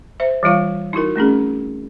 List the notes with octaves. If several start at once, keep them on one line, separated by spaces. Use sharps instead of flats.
C5 E5
E3 G3 F4 F5
D#4 E4 F#4 A#4
A3 C4 C#4 G#4